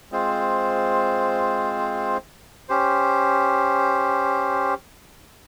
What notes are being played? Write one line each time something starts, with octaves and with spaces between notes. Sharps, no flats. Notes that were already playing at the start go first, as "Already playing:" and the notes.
G#3 C4 F4 C5
C#4 G4 C5